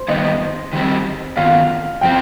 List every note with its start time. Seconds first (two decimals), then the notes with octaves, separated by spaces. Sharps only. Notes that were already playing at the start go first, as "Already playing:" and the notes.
Already playing: C5
0.08 G2 D#3 B3 D#5
0.73 D#3 G3 C4
1.37 D#3 B3 F4 F5
2.01 F3 C4 F4 G5